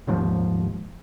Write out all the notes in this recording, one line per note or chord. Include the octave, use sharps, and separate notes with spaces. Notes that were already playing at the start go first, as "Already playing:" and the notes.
D#1 D#2 G#2 F3